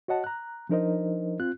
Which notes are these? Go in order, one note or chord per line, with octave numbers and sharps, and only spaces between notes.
F#4 C#5 D#5 F#5 A5
A#5 F#6
F3 D4 D#4 A#4 C5 D#5
C4 F4 F#6